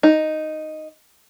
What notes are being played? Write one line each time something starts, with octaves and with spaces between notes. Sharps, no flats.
D#4